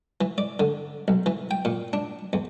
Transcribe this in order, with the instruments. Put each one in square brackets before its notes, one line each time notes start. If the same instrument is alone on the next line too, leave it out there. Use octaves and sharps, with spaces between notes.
[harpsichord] E3
D5
D3
B1
E3
G5
A#2
D4
E2